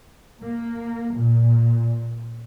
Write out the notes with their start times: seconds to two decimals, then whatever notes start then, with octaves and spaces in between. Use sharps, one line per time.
0.42 A#3
1.15 A#2